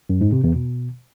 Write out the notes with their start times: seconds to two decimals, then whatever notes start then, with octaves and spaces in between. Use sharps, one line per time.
0.09 F#2
0.21 G#2
0.32 C3
0.44 E2
0.55 B2